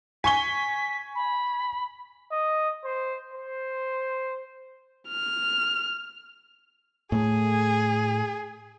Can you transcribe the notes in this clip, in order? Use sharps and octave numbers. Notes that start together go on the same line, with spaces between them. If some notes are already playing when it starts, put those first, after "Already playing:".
G#5 C#6 B6 G7
B5
D#5
C5
C5
F6
A2 A3 G#4